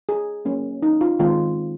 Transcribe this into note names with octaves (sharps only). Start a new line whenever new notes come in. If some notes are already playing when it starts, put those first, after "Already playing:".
G#4
F#3 A#3 C#4
D#4
F4
D#3 G#3 C4 F4